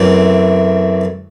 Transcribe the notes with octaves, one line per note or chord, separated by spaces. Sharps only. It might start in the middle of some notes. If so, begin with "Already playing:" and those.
Already playing: F#2 C#3 E3 A3 C4